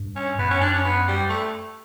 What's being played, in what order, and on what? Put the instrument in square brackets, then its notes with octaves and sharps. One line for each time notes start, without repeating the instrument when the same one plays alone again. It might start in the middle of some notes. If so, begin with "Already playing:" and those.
Already playing: [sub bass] G2
[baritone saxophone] C#4
[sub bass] F#2 [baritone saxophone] B3
[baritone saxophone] C#4
D4
C#4
B3
G3
A3